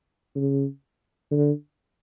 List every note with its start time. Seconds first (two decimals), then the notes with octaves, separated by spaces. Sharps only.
0.35 C#3
1.31 D3